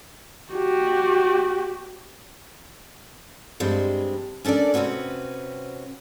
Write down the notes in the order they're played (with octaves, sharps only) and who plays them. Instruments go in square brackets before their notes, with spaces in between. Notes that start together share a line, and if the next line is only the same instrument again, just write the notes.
[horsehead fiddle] F#4 G4
[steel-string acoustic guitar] G2 G3 G#3 C4
C#4 D4 A4 A#4 D5
C3 C4 C#4 F#4 B4